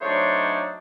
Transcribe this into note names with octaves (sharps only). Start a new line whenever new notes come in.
F#3 A3 D4 D#4 C5 C#5